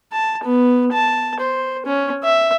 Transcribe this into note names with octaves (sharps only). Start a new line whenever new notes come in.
A5
B3
A5
C5
C#4
E5